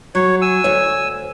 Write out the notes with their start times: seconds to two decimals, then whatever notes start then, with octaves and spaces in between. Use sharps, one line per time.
0.15 F#3 C#5
0.42 G#5 E6
0.64 D2 C#5